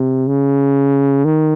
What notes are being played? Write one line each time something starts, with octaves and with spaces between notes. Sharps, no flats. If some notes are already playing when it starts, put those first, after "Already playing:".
Already playing: C3
C#3
D#3